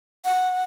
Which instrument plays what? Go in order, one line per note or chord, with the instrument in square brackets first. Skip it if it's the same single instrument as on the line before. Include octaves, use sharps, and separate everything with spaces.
[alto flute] F#5